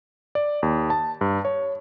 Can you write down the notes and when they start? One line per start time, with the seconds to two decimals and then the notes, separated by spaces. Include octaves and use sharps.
0.35 D5
0.63 D#2
0.90 A5
1.21 G2
1.45 C#5